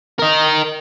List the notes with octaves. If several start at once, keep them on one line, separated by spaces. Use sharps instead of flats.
A#4 D#5